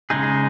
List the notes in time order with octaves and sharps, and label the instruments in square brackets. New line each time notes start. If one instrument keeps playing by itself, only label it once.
[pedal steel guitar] C#3 G#3 D#4 G#4